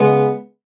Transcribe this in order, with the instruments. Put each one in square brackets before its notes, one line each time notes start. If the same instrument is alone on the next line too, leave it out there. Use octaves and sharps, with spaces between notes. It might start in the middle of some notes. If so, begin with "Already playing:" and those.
Already playing: [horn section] C#3 G#3 B3